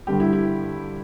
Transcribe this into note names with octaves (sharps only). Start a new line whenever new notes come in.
G2 D3 G3 G4
E4
E4